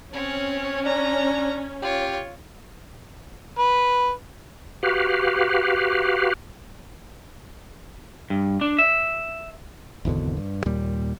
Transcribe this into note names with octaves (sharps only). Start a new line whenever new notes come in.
C4 C#4 C#5
D4 A#5
F4 G4 C#5
B4
F#4 G4 B4 F5
G2
D4
E5
G#1 E2 B2 D3
G2
D#2 A#2 G3